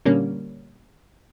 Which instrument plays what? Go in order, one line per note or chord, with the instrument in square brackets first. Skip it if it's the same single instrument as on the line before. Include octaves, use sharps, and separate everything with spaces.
[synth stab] A#2 D3 G3 A#3 C#4